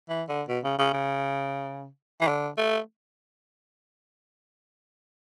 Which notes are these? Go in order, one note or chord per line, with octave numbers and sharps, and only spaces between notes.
E3
D3
B2
C#3
C#3
C#3
E3
D3
A3